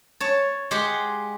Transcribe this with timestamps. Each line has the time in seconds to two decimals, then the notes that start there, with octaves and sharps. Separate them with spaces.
0.20 C#5 A5
0.71 G#3 G4 F#5 C6